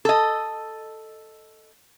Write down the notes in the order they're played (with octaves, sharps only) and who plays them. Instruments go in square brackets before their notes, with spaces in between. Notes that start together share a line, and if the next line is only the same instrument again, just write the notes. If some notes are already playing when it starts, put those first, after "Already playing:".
[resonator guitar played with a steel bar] A4 D#5